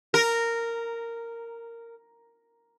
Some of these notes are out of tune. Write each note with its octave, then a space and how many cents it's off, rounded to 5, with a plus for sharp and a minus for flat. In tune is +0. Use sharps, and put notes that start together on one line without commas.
A#4 -10